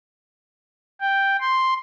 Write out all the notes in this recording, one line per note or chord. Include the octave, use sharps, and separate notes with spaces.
G5
C6